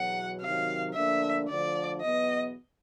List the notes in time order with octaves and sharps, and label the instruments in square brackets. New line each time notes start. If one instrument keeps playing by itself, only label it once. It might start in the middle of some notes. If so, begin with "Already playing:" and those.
Already playing: [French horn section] E2 B2 F#3 [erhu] F#5
[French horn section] C3 D#3 F#3 [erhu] F5
[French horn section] D2 D3 F3 A#3 D4 [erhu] E5
[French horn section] D2 D3 F3 [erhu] D5
[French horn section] E2 B2 F#3 B3 [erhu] D#5